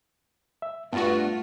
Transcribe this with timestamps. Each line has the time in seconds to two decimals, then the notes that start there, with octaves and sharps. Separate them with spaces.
0.62 E5
0.93 G2 A3 B3 F4 F#4